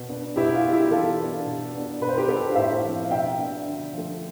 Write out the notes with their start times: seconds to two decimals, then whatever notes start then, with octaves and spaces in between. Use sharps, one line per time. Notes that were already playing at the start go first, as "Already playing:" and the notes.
Already playing: B2
0.09 B3 D4
0.36 B2 E4 G4
0.54 F4
0.65 B3 D4
0.73 E4 G4
0.91 E3 F4 A4
1.19 B3 D4
1.46 B2
1.73 B3 D4
2.01 B2 B4
2.09 C5
2.17 G4 B4
2.28 B3 D4 A4 C5
2.51 F5
2.55 A2 C5 E5
2.84 F3 C4
3.02 F5
3.11 B2 E5 G5
3.38 B3 D4
3.66 D3
3.93 F3 A3